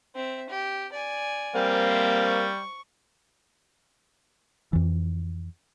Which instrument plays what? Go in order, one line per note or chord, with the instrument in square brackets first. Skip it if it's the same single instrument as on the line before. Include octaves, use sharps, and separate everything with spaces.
[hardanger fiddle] C4 E5
G4
D5 G#5
[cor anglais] G3 [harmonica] A#3 C4 F5
[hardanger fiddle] C5 E5
C#6
[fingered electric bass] F2 E3